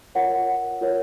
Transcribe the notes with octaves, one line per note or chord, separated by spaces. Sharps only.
F4 A#4 C#5 F#5
F4 A#4 C#5